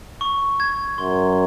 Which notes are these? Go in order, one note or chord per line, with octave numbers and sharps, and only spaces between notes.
C#6
G#6
F#2 C6